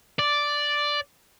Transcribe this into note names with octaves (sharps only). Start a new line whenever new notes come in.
D5